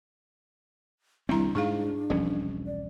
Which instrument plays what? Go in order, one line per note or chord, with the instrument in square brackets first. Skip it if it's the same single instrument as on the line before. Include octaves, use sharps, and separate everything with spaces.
[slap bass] C2 D#3 C4 [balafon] G3 E4 A#5 [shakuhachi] D4
[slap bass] G#2 [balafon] D#4 G#4 F5
[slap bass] E1 C2 C#4 [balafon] F3
[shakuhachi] D5